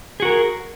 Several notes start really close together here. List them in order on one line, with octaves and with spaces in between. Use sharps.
G#4 F#4 A#4